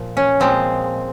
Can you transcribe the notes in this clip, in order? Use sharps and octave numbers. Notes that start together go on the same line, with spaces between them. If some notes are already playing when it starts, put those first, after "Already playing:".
Already playing: A#2 F3
C#4
A#2 F3 G#3 C4